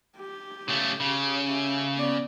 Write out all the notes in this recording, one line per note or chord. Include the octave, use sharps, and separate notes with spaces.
G4
C#3 A3
C#3
G4 E5
B3 D5